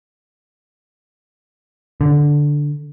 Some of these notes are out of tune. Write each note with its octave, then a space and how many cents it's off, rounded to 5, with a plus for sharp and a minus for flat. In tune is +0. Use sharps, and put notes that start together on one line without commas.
D3 -5